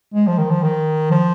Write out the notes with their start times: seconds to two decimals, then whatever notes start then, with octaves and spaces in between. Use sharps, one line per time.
0.14 G#3
0.27 F3
0.38 D#3
0.51 F3
0.63 D#3
1.11 F3